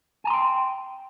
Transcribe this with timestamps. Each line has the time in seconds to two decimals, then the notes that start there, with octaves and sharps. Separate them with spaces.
0.24 G#5
0.27 A#5
0.30 C6
0.33 G5